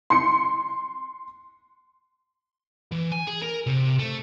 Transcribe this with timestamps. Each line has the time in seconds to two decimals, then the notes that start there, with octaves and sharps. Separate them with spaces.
0.10 C6 C#7
2.92 E3
3.12 G#5
3.28 G#4
3.43 A#4
3.67 C3
3.99 A3